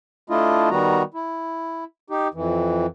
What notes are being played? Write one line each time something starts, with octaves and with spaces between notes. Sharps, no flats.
A3 D4 E4 F4 D#5
D#3 G3 B3 F#4 A#5
E4
D#4 G4
F2 E3